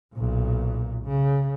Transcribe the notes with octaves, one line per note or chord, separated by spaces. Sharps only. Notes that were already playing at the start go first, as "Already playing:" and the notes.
B1 A#2
C#3